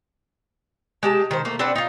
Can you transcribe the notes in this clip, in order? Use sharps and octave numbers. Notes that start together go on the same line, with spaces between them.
G#3 G4 A5
D#3 C5
A3 A#3
C4 D4 B4 F#5
D#4 F4